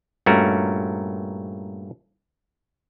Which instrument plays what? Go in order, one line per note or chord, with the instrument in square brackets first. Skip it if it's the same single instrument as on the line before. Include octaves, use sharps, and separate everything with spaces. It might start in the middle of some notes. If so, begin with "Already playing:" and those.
[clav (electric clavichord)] G2 A#2 A3 C#4 F#4 A#4